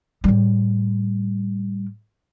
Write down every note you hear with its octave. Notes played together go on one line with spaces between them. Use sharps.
A2 G3